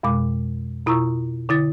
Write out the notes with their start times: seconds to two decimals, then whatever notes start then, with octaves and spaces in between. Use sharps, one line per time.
0.03 F2 B2 G#3 D6
0.86 B2 E4 F4 A#5 C#6 E6
1.49 D3 E4 A6